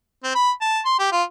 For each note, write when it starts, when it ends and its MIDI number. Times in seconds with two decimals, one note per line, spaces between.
0.24 0.32 60
0.35 0.51 83
0.61 0.80 81
0.85 0.97 84
0.99 1.11 67
1.12 1.23 65